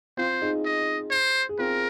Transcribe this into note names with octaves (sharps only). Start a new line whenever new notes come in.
C4 F4 C5
D#4 G#4
D#5
C5
G#4
C4 F4 A#4